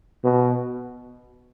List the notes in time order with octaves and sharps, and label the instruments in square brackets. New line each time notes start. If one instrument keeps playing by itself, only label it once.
[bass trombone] B2